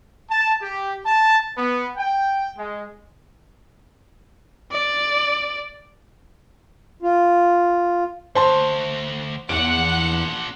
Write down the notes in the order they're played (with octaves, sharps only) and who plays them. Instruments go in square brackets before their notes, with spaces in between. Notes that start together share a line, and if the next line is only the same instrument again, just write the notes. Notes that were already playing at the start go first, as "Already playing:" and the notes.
[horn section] A5
G4
A5
B3
G5
G#3
[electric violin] D5
[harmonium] F4
[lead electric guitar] D2 [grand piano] C5 A5 C6
[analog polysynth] E2 [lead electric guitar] A#2 D4 [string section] F#5 [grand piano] D7